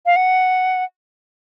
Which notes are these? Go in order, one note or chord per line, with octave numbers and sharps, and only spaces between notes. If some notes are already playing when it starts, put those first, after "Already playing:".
F5
F#5